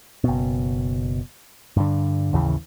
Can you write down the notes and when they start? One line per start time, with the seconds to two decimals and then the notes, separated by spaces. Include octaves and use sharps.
0.24 F#1 B2
1.77 G2 D3
2.33 A1 D#2 C#3 E3